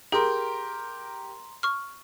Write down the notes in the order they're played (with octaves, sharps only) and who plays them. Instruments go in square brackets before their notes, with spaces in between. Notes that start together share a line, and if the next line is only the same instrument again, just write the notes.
[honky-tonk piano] G4 A#4 [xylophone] G#4 [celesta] A#5 C6
[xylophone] C#6 F6